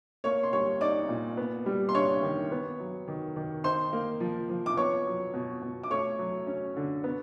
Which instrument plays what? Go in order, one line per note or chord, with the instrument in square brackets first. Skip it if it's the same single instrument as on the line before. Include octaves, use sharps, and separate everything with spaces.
[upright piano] A#3 C#5 C#6
C6
G3 C#5 C#6
D#4 D5 D6
A#2
B3
G3
C6
D4 C#5 C#6
D#3
B3
F#3
D#3
D#3
D#4 C5 C6
A#3
F3
F3
D6
B3 C#5 C#6
F#3
B2
B2
D6
A3 C#5 C#6
F#3
C#4
D3
B3